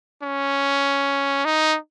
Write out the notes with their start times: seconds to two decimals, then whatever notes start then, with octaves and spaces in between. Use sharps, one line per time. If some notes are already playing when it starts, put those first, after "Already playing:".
0.23 C#4
1.45 D#4